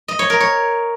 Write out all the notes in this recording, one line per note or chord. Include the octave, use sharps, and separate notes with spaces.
D#5
C#5
A#4
C#5